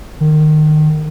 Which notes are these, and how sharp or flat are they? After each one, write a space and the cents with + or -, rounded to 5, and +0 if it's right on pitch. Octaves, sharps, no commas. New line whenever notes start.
D#3 -25